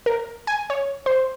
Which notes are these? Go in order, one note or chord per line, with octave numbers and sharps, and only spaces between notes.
A#4
G#5
C#5
C5